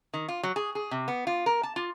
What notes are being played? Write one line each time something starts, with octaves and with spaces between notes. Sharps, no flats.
D#3
F4
F#3
G#4
G#4
C3
B3
F4
A#4
A5
F4